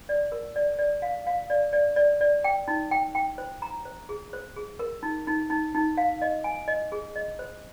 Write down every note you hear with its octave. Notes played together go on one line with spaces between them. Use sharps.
D5
A#4
D5
D5
F5
F5
D5
D5
D5
D5
G5
D#4
G5
G5
C5
A#5
C5
G#4
C5
G#4
A#4
D#4
D#4
D#4
D#4
F5
D#5
G#5
D#5
G#4
D#5
C5